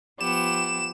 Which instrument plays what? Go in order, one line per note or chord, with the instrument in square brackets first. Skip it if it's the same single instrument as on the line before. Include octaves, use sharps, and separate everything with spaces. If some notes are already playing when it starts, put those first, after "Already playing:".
[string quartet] F3 B3 G4 [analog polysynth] E7